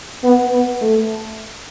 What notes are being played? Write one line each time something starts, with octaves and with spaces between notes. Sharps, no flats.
B3
B3
A3